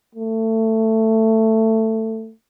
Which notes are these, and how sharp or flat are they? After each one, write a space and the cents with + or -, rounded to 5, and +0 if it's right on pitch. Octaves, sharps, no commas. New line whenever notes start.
A3 +15